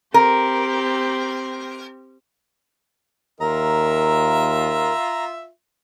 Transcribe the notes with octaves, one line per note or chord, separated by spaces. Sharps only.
C4 G4 A#4
D#2 F4 A#4 E5 A#5